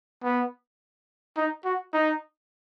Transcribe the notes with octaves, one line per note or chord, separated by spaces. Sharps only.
B3
D#4
F#4
D#4